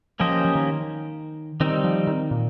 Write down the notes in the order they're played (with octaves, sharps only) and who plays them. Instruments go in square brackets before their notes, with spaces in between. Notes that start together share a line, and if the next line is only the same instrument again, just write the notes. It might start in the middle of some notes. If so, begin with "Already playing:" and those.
[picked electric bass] F3 [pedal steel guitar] A#3 C#4 G4 C5 D#5
[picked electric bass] F3
D#3
[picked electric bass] D#3 [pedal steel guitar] G3 C4 D#4
[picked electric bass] F3
D#3
A#2